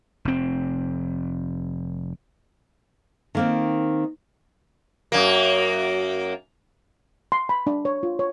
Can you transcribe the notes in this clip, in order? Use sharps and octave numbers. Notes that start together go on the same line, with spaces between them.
F1 C4
D#3 A#3 C4
F#2 A#3
C6
B5
D4
C#5
F4
C#5